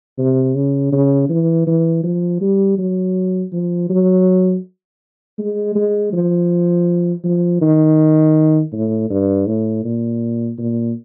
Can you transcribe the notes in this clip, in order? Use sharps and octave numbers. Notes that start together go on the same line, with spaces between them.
C3
C#3
C#3
E3
E3
F3
G3
F#3
F3
F#3
G#3
G#3
F3
F3
D#3
A2
G2
A2
A#2
A#2